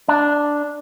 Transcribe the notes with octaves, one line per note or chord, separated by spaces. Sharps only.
D4